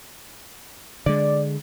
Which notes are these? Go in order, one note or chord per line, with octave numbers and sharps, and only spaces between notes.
D3 G#3 D5